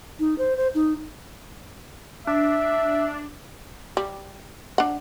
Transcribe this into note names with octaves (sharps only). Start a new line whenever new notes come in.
D#4
C5
C5
D#4
D4 E5
G3
D4 F#5